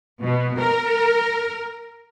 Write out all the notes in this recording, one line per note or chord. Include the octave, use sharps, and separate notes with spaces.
B2
A#4